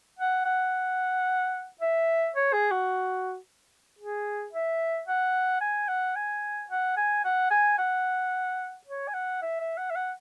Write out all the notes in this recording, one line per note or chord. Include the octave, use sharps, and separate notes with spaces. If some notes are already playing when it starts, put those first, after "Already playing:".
F#5
F#5
E5
C#5
G#4
F#4
G#4
E5
F#5
G#5
F#5
G#5
F#5
G#5
F#5
G#5
F#5
C#5
G#5
F#5
E5
E5
F#5
E5
F#5